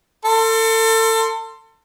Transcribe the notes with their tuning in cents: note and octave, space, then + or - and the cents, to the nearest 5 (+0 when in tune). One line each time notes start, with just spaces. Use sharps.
A4 +30 C6 +0